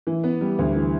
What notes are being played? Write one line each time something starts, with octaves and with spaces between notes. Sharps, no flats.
E3
B3
G3
D2
E3